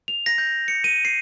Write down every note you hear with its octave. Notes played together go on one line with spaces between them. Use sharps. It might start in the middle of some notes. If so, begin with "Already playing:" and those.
F7
A#6
G6
C#7
D#7
C7